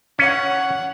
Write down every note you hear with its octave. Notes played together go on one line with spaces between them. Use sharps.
C#4 C#5 F#5